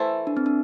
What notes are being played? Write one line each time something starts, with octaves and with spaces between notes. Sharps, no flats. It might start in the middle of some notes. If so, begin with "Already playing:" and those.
Already playing: E3 A3 E4 A4 C5
D4
C4
D4